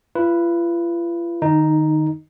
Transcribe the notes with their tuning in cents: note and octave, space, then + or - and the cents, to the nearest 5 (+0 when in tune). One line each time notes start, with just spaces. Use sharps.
F4 -45 B4 +0
D#3 -30 D#4 +0